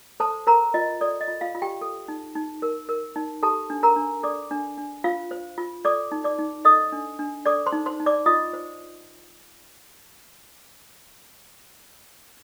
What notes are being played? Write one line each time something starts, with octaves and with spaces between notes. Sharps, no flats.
A4 C5 A5
A#4 C5 A#5
F4 D#5
A4 D5
D#5
F4
F4 F5
F4
G4 G5
A4
D#4
D#4
A#4
A#4
D#4
G4 A4 A5
D4
A#4 A#5
D4
A4 D5 D6
D4
D4
F4 C5 F5
C5
F4
A4 D5 D6
D#4
D5 D6
D#4
A4 D#5 D#6
D4
D4
A4 D5 D6
C5 C6
D#4
C5 C6
D#4
D5 D6
F4 D#5 D#6
C5